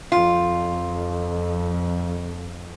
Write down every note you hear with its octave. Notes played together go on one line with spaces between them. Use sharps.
F2 F4